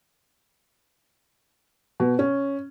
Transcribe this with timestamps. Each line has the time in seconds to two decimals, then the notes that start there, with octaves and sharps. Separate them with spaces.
2.00 B2
2.19 C#4